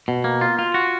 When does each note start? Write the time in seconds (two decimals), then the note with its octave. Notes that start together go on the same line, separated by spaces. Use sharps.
0.08 B2
0.24 A#3
0.41 F4
0.59 F4
0.74 F#4